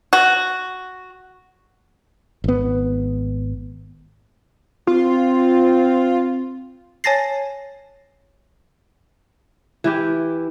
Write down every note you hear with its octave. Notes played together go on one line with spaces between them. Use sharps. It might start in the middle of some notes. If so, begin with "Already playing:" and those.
F#4
G#1 B3
C4 F4
C#5 G#5 A5 A6 A#6 C7
E3 E4 G4